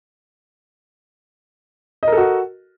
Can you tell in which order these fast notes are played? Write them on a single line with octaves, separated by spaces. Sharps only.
D#5 A#4 A4 F#4